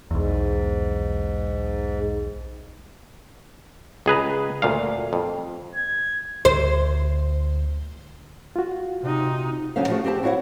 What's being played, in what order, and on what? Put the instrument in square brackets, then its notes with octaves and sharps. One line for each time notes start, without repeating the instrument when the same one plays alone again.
[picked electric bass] B1 E2 [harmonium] G#2
[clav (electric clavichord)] C#2 G#4 B4 A#5
D2 A#2 F5
F2
[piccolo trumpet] G#6
[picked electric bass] D2 [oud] C5
[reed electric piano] F4 F#4
[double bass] C3 D#4
[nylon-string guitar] D2 D3 F#3 C#4 C5 F5
F3 G3 A3 C#4 F#4 G#4
C4 G4 C5 A5
E4 F#4 C#5 F5 F#5